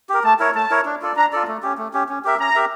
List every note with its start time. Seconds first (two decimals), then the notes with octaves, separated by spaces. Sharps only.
0.09 G4 A#4
0.24 A3 A5
0.39 E4 A#4 C#5
0.55 A3 A5
0.70 E4 A#4 C#5
0.85 D4
1.02 F4 A4 D5
1.16 D4 A#5
1.32 F4 A4 D5
1.48 A3
1.63 C#4 G4
1.78 A3
1.94 C#4 G4
2.09 C#4
2.25 G4 A#4 E5
2.39 C#4 A#5
2.55 G4 A#4 E5